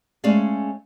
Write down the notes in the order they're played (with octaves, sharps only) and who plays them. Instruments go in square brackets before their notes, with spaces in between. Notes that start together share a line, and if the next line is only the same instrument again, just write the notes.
[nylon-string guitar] G#3 A3 C#4 G#4 D5 F5